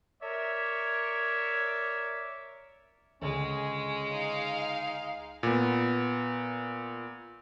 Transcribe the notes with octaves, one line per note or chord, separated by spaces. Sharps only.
A#4 C#5 D5 E5
C#2 D3 G#3 C#4
D#4 F5
A#2 B3